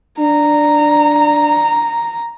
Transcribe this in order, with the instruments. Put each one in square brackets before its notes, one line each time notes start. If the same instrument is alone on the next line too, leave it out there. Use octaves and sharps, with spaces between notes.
[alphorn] D4 [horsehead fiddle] A#5